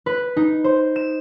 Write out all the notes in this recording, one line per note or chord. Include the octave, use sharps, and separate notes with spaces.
B4
D#4
C5
E7